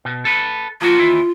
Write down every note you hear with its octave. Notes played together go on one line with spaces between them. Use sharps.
B2
A4 B4
F3 A#3 F4 F#4
D#2 E3 E4